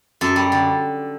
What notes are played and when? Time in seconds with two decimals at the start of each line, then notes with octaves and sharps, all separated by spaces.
0.21 F#2 A4
0.36 G3
0.52 D3